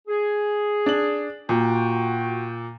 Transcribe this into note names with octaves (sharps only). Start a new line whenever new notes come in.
G#4
D4 F#7
A#2 F#4 G5